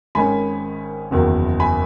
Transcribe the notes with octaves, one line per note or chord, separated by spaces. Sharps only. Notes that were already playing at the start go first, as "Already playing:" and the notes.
G#1 G#2 D#3 G#3 C#4 G#5 B5
F#1 E2 D#3 F#3 A#3
G#5 B5